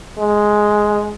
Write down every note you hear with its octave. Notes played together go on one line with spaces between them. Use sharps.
G#3